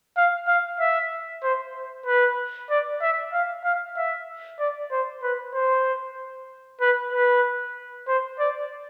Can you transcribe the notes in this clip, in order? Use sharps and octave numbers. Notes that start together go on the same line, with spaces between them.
F5
F5
E5
C5
B4
D5
E5
F5
F5
E5
D5
C5
B4
C5
B4
B4
C5
D5